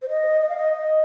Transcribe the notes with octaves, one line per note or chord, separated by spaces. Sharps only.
C5
D#5
D#5
F5
D#5
D#5